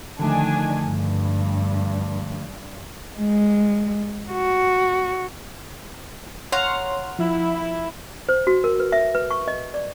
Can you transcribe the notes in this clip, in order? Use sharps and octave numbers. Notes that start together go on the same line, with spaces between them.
D3 D#3 F3 A3 D4 G#5
G2
G#3
F#4
C#5 F5 F#5 A#5 C6
F3 E4
C5
F#4
A#4
B4
E5
B4
C#6
D#5
D5